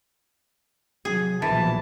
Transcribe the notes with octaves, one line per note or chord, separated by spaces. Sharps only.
C3 F#3 G#4
B1 A#2 E3 F3 A5